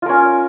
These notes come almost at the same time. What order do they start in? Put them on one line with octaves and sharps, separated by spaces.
F4 A#4 C#4